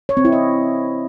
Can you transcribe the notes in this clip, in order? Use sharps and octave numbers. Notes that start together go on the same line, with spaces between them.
C#5
C4
E4
D#5